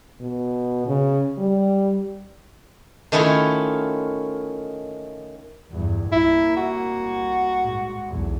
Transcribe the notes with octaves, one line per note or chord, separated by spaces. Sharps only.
B2
C#3
G3
D#3 A3 C#4 E4 F4
E2 G2
C2 A#3 E4
F#4
G#2
B1 E2